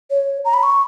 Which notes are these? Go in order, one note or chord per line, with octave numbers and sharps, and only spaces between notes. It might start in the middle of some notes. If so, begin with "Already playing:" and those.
C#5
A#5
B5
C#6